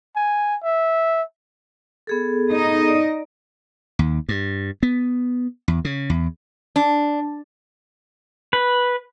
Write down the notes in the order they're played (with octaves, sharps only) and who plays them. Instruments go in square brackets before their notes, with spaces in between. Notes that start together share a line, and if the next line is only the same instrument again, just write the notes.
[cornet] G#5
E5
[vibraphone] B3 G#4 A4
[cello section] D#4 D#5
[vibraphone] D5
[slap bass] D#2
G2
B3
E2
C#3
E2
[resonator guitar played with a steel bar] D4
[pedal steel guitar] B4